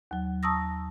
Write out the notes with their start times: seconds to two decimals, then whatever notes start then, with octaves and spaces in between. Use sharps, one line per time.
0.11 D#2 F#3
0.43 A5 A#5 C#6 D#6 E6 A#6